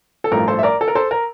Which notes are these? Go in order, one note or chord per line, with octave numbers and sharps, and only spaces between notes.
A4
A1 G2 F3 A3 A#4
A4 C5
E5
A#4 D5
A4
A#4
A4 C5
A#4